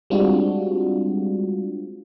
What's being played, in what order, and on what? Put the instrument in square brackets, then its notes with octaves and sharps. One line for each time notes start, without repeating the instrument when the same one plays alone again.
[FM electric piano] G3 G#3 C4 D4 F4 F#4